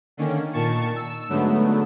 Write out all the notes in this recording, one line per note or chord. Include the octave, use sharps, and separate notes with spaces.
D3 D#3 A#3 C#4
A#2 D#3 A5 C#6
E6
G#2 D3 F#3 A3 B3